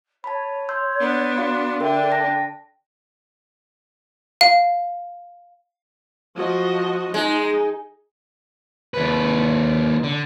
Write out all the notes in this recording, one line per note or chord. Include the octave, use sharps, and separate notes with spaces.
C#5 A5 B5
C6 E6 G6
B3 D4
F#4 F5 C6
D3 D4 A#4 E5 G5
A5 A#6
F5
F3 F#4 D#5
G#3 D#4
D#2 B4
D3